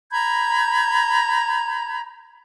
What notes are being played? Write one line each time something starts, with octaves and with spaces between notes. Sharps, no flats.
A#5 B5 G6 G#6